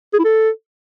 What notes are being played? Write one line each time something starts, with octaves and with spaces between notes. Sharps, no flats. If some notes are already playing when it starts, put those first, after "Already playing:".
G#4
E4
A4